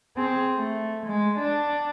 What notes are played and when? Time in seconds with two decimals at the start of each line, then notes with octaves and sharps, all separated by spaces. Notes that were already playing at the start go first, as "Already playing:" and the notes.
0.17 C4 G#4
0.56 A3
1.05 G#3
1.38 D4